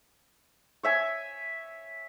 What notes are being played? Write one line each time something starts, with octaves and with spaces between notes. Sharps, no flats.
C#5 E5 G#5